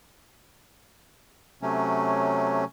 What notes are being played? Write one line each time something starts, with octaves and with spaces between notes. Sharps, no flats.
C3 F#3 A3 C#4